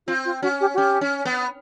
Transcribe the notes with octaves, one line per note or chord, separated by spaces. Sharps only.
C4 F4
F4
C#4 F#4
G4
F#4
C#4 G4
C#4
B3